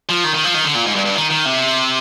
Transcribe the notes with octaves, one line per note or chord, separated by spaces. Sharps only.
F3
D#3
D#3
F3
D#3
D3
A#2
G#2
G2
G2
D#3
D#3
C3